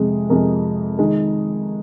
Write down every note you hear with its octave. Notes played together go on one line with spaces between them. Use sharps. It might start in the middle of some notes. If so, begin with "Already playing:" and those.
Already playing: F2 C3 G#3 G#4
F2 C3 G#3 A#4
D#3 G#3 G#4